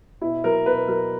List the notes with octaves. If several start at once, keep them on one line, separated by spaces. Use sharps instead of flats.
B2 E4
F#3 A#4
B2 B4
F#3 A#4